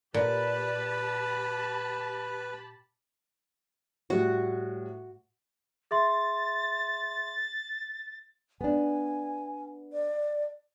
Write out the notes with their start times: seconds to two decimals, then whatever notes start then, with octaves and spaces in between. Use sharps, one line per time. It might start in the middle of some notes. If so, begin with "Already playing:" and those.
0.14 A#2 G4 B4 A5 B5
4.10 A2 G3 F#4
5.91 G#4 E5 C6 A6
8.61 B3 D4 G#5
9.92 D5